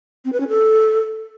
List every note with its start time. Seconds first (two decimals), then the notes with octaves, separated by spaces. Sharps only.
0.25 C4
0.33 B4
0.40 C#4
0.48 A4